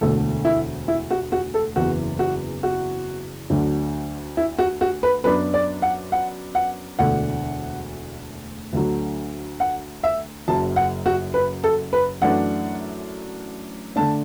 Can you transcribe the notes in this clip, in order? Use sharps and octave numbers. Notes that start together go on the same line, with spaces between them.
E1 D2 D3 A3 A4
E4
E4
F#4
F#4
A4
F#1 E2 E3 F#4
F#4
F#4
D2 D3 F#3 D4
E4
F#4
F#4
B4
F#2 F#3 B3 D4 B4
D5
F#5
F#5
F#5
E1 D2 D3 A3 D4 F#5
D2 D3 F#3
F#5
E5
F#1 F#2 F#3 A5
F#5
F#4
B4
A4
B4
F#2 E3 A3 D4 F#5
D3 A3 D4 A5